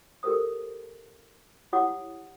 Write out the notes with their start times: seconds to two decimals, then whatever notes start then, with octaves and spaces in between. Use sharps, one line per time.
0.23 G4 A4 A#4 C5 D#6
1.73 E4 G4 C#5 F#5 D6 D#6